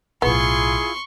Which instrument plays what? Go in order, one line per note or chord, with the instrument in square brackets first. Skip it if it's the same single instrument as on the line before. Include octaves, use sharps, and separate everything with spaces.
[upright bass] B1 A2 [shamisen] B3 [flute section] E4 F4 G#4 [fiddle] C6 C#6